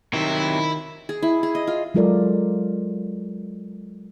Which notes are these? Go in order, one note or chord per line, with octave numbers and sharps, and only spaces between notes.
C3 D#3 F#3 E4
G#4
E4
G#4
D#5
F4
F#3 G#3 F4 A4 A#4 D5